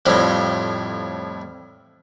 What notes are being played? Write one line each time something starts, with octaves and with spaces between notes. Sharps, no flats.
F2 A2 F3 G3